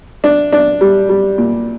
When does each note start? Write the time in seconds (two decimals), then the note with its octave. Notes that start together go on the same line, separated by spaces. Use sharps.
0.24 D4
0.52 D4
0.81 G3
1.09 G3
1.38 A#2